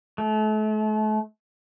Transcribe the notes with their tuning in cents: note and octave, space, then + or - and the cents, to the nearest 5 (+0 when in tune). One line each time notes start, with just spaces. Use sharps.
A3 -35